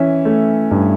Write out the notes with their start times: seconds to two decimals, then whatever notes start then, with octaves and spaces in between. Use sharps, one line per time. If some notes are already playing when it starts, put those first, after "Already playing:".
Already playing: E3 C#4 E5
0.25 A3
0.71 G2